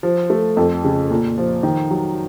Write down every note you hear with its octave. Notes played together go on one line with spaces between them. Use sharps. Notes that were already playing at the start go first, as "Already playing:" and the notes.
F3
A3
F2
C#3
A#2
F3
D#3
F#3